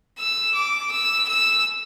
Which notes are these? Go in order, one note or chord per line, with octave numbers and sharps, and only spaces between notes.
E6
D6
E6
E6